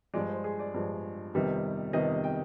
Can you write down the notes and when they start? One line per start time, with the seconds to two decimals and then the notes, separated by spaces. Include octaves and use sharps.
0.14 G2 F3 G#3 D5
0.29 C5
0.44 G#4
0.59 D5
0.74 G2 F3 G#3
1.34 F2 C3 D#3 G3 B3
1.93 F2 C3 D#3 G3 B3 D#5
2.24 G5